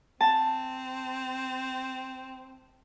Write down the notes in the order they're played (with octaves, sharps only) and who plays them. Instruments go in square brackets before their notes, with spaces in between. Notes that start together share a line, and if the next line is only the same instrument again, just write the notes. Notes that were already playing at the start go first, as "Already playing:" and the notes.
[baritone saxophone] C4 [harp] A5